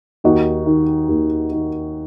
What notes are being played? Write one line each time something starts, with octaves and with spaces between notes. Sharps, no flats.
D#2 D#4 F#4
D#3
D#2
D#3